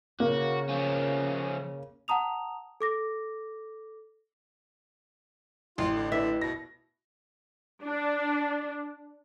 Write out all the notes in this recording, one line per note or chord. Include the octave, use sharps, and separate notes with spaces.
C#3 A#3 F#4
F3 C#4
F#5 A5 A#5 D#6 F7
A4 D6 A#6
A1 E4 F4
D3
D3 E4 B4 D5 E5
B2 A#6
D4